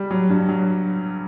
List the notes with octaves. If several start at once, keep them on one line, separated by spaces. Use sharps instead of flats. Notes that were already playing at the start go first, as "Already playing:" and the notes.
Already playing: G3
F#3
G2
F#3